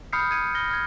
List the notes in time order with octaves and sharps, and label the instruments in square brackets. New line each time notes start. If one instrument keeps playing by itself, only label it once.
[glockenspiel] B5 D#6 F6 G6 C7 C#7
D#6 G#6 C#7 D#7
B5 F6 A#6 G7
F6 G#6